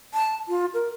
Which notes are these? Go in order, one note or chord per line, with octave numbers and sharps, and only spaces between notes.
A5
F4
A#4